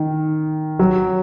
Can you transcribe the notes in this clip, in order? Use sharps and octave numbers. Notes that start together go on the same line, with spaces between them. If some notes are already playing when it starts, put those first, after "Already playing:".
Already playing: D#3
F#3